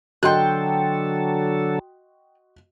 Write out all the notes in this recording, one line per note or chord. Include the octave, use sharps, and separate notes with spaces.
D3 F#3 F#4 A4 D#5 G5 C6 F#6